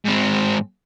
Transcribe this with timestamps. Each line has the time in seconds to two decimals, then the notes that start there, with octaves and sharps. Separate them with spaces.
0.05 G#2 C4